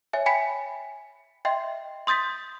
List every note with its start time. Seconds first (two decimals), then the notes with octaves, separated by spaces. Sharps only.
0.13 C#5 E5 G#5
0.26 G5 G#5 B5 B6 C#7
1.45 D#5 E5 G5 C6
2.07 C6 D#6 G6 A6 B6